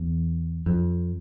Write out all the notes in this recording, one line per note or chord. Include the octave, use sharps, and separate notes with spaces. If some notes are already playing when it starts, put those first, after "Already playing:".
Already playing: E2
F2